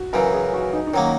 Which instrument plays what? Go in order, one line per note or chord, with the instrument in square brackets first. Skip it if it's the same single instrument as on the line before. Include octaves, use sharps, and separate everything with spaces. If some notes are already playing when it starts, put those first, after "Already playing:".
Already playing: [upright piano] F#4
[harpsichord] F#2 C#3 E3 [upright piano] A#4
[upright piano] G#4
F#4
D#4
D#4
[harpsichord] D#3 F#3 A#3 [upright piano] C#4